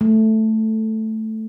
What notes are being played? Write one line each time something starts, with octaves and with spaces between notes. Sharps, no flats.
A3